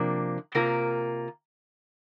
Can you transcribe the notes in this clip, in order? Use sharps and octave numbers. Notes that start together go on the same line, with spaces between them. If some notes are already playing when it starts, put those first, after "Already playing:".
Already playing: C3 F3 A#3 D4
C3 A#3 F4 A#4